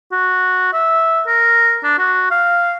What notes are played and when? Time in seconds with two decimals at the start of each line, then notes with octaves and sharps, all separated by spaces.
0.12 F#4
0.73 E5
1.27 A#4
1.84 D4
1.98 F#4
2.31 F5